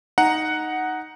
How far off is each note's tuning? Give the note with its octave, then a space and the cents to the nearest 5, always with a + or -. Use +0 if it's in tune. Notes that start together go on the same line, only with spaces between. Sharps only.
D#4 +0 F#5 +0 A#5 +0